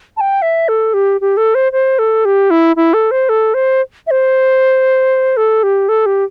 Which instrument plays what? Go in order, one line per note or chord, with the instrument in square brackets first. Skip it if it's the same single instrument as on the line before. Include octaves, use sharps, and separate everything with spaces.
[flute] A5
G5
E5
A4
G4
G4
A4
C5
C5
A4
G4
E4
E4
A4
C5
A4
C5
E5
C5
A4
G4
A4
G4